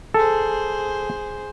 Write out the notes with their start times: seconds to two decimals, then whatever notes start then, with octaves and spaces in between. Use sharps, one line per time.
0.14 G#4 A4 C5